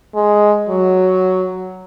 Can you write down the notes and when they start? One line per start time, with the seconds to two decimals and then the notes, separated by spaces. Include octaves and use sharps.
0.15 G#3
0.69 F#3